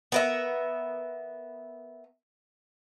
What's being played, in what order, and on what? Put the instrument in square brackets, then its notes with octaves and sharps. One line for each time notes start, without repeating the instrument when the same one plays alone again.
[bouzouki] B3 A#4 E5